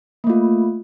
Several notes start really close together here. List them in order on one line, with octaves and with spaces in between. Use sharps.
A#3 A3 F4